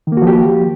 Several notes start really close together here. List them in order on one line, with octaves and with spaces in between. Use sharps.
D#3 A#3 F#4 F3 G4